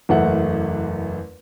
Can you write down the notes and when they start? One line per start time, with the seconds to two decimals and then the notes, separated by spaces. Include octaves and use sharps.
0.09 F#1 E2 A3 F#5